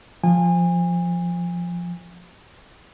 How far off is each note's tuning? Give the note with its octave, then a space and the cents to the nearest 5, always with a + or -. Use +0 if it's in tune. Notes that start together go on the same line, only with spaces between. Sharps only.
F3 +0 G#5 -30